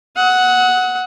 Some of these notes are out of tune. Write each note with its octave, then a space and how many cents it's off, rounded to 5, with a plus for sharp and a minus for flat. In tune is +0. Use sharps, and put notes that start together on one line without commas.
F#5 +0 D#6 +45